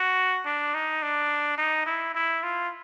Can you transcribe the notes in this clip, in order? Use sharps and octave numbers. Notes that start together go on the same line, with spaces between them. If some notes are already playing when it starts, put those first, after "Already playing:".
Already playing: F#4
D4
D#4
D4
D#4
E4
E4
F4